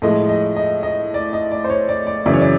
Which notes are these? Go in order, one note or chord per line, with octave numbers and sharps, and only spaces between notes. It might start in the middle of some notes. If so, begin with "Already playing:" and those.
A2 F3 G#3 D#5
D#5
D#5
D#5
D5
D#5
D5
C5
C#5
D5
D5
F#2 C#3 E3 D5
C#5
D5